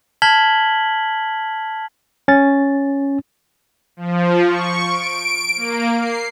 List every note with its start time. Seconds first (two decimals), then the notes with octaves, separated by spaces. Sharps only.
0.22 A5 F6 G#6 B6 F#7 G7
2.28 C#4 A6
3.97 F3
4.46 C#6
4.85 D7
5.57 A#3
5.99 C7